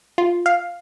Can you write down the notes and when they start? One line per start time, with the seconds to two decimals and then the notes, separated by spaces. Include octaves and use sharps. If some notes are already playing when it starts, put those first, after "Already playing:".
0.18 F4
0.46 F5